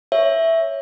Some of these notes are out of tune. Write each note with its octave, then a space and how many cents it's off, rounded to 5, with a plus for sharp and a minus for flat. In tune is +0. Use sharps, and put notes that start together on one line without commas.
C#5 +0 E5 +0